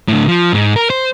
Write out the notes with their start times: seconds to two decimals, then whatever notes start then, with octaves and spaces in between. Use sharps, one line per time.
0.08 A2 D3
0.28 F3
0.53 G#2
0.76 A#4
0.90 C5